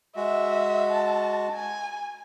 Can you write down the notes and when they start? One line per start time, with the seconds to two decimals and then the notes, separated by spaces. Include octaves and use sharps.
0.16 G#3 F#4 E5
0.90 A5
1.55 G#5